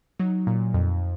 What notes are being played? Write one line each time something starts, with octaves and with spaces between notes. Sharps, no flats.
F#3 D#4
A#2
F2